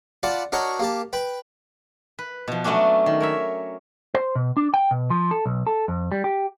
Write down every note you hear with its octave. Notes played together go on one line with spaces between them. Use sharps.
F4 D5 F#5 A5 B5
D4 F#4 A#4 C#5 D#5 C#6
A#3 G4 A5
B4 G5 B5
B4
B2 F3
F#3 A3 B3 C#4 D4
D#3
A#4 C#5 E5
C5
B2
D4
G5
B2
F3
A4
B1
A4
F2
G3
G4